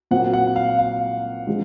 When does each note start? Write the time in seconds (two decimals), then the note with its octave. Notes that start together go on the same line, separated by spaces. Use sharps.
0.11 A#2 F#3 C4 F#5
0.33 F#5
0.56 F5
0.79 F5
1.47 F3 G#3